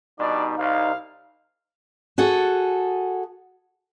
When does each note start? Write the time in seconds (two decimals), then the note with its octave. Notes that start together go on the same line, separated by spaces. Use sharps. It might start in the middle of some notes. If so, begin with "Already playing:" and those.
0.20 B2 G3 D4 D#4 D5 A5
0.58 C2 F5
2.18 F#4 G#4 A4 F#5